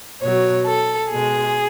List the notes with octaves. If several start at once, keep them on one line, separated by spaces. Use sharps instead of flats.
B2 F#3 C#5
A4
B2 G#3 G#4